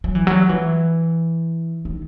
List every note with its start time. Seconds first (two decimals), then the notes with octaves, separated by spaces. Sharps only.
0.04 F#3
0.15 E3
0.27 F#3
0.49 E3
1.85 D#3